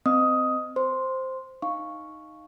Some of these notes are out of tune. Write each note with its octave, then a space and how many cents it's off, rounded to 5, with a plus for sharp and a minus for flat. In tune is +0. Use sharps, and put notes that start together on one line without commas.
C4 -25 D#5 -10 D#6 +10
C5 +0 C6 +0
D#4 +0 F5 +0 C#6 +0